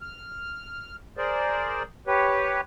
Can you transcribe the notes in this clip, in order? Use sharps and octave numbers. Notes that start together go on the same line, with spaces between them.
F6
G#4 A#4 C5 D5
G4 B4 C#5